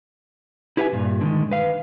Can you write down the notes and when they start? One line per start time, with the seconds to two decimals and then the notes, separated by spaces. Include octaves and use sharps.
0.77 E4 G4 B4 E5 F5 G#5
0.92 G2 A#2
1.21 D3 D#3 G#3
1.51 B4 F5